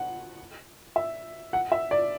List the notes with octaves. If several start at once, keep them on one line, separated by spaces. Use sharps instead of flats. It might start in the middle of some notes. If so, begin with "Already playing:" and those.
Already playing: F#5
E5
F#5
E5
D5